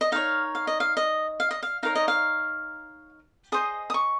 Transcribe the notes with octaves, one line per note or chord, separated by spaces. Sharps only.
D#5
D#4 A#4 C#5 F5
F5
D#5
F5
D#5
F5
D#5
F5
D#4 A#4 C#5 F5
D#5
F5
G#4 C5 D#5 D#6
D#6
C#6